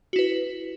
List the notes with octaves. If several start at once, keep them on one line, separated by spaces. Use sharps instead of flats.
E4 F#4 B4